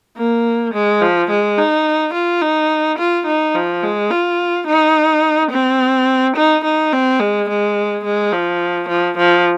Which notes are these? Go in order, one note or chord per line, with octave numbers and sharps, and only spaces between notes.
A#3
G#3
F3
G#3
D#4
F4
D#4
F4
D#4
F3
G#3
F4
D#4
C4
D#4
D#4
C4
G#3
G#3
G#3
F3
F3
F3